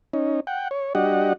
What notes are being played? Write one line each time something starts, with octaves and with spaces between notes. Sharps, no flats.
C#4 D#4
F#5 G5
C#5
G3 D4 F#4 G4 D#5 F#5